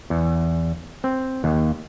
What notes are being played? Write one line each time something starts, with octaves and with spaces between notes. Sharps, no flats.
E2
C4
D#2